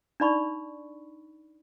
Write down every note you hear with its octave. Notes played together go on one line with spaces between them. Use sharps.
D4 D#4 D5 B5 C#6